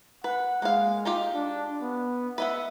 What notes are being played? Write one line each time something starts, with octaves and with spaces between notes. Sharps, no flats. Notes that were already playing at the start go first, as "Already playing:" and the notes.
B4 F#5
G#3 A#3 F5
D#4 F4 G4
D4
B3
B4 D#5 E5 F#5